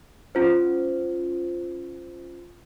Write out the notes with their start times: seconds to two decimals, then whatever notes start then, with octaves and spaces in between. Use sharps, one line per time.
0.35 C#4 F4 C5